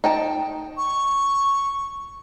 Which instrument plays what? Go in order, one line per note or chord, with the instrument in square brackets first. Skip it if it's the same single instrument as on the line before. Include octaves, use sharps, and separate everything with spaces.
[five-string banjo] D#4 G5 A5
[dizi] C#6